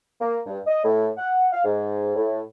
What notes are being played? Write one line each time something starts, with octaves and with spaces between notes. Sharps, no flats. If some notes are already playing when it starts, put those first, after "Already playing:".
A#3
G2
D#5
A2
F#5
F5
G#2
A2